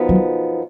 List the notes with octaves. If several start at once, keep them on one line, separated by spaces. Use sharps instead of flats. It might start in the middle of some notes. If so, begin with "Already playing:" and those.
Already playing: F#2 F3 B3 D#4
F#3